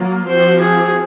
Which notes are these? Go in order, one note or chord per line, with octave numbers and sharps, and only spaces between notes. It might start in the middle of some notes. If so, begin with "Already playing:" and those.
Already playing: F#3 A#3 F4
F3 C4 F#4 C5
G#4